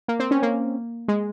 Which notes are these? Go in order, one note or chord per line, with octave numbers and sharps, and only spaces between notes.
A#3
C4
C#4
A#3
G#3